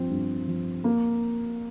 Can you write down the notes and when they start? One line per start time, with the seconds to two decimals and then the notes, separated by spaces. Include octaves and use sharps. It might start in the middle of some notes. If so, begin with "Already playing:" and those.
Already playing: G2 F3 C4
0.10 G2
0.48 F3
0.84 A#3